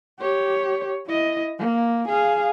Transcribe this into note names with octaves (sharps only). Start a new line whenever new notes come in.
G4 C#5
E4 D#5
A#3
G#4 F5